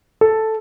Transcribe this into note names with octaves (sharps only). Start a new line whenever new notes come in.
A4